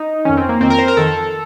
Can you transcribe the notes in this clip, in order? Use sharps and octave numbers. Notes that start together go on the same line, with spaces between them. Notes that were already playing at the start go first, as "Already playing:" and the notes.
Already playing: D#4
F2 D#3 C#4
C4
A#3
F2 D#3 C4
A#4
C5
A#4
F2 D#3 A4